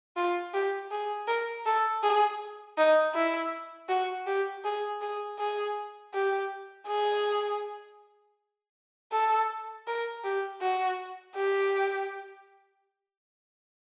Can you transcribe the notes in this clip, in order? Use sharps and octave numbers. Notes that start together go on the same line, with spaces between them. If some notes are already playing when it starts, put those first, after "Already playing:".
F4
G4
G#4
A#4
A4
G#4
D#4
E4
F#4
G4
G#4
G#4
G#4
G4
G#4
A4
A#4
G4
F#4
G4